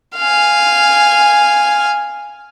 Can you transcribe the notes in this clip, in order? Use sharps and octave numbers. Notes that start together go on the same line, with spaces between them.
F5 G#5